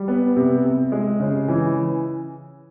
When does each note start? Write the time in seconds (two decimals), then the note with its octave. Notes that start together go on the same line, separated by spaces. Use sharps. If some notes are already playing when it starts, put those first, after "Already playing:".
Already playing: G3
0.08 B3
0.36 C3
0.65 C3
0.92 G#3
1.20 C#3
1.48 E3